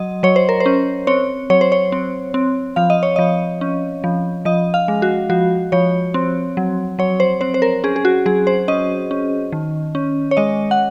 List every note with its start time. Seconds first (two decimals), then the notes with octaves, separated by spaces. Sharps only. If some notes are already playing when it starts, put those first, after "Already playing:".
Already playing: F#3 D#5
0.23 F#3 C#5
0.36 C5
0.49 A#4
0.60 C5
0.66 C#4
1.07 C4 C#5
1.50 F#3 C#5
1.61 C5
1.72 C#5
1.92 C4
2.34 C4
2.76 F3 F5
2.90 D#5
3.03 C#5
3.16 F3 D#5
3.61 C#4
4.04 F3
4.45 F3 D#5
4.74 F5
4.88 G#3
5.02 F#4
5.29 F3 F#4
5.72 F3 C#5
6.14 C4
6.57 F#3
6.99 F#3 C#5
7.20 C5
7.41 C4 C5
7.54 C5
7.62 A#4
7.84 C#4 G#4
7.96 G#4
8.05 F#4
8.26 F#3 G#4
8.47 C5
8.68 C#4 D#5
9.11 C#4
9.52 D#3
9.95 C#4
10.31 C#5
10.37 G#3 D#5
10.71 F#5